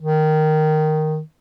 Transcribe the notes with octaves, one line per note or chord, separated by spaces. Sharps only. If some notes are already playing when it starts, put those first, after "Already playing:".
D#3